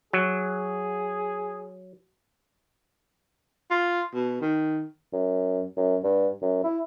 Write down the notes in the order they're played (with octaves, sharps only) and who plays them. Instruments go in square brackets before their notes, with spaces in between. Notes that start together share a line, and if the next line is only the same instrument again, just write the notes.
[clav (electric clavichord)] F#3 [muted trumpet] G#4
[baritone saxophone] F4
B2
D#3
[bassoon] F#2
F#2
G2
F#2
E4